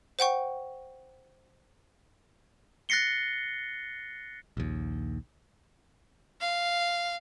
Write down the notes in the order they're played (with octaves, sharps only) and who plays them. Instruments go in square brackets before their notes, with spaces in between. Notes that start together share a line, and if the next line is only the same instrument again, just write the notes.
[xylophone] C5 F#5 G5 C#6
[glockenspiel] F#6 A6 A#6 C7 C#7 G7
[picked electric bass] A#1 D#2
[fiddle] F5